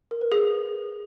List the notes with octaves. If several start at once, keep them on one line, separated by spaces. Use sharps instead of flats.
A#4
B4
G#4